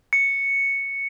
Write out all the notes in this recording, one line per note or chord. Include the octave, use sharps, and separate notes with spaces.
C#7